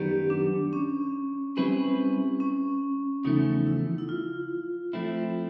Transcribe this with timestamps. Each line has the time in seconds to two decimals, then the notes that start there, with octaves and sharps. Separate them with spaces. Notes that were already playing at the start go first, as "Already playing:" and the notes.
Already playing: F#2 D#3 G3 B3 G4
0.30 D4
0.73 C#4
1.57 G3 C4 C#4 E4 G#4 B4
2.40 C#4
3.24 E2 C#3 F3 A3 D#4
3.67 E4
3.98 E4
4.09 F4
4.93 F3 A3 C4 E4